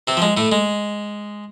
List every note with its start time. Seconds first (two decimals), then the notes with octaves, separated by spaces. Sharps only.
0.08 C3 C4
0.17 F3
0.22 G#3
0.37 A2 A3
0.52 G#3